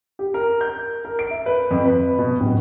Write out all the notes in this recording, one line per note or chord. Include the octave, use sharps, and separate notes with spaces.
G4
A#4
G6
A#4
D7
E5
B4
F2
B4
B2
D1